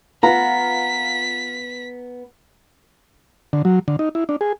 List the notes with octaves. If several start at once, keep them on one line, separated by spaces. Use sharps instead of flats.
B3 F4 A#5 B6
D3
F#3
D3
D#4
E4
D4
G#4